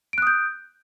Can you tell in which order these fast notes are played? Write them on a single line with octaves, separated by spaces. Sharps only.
D7 F#6 D#6 G6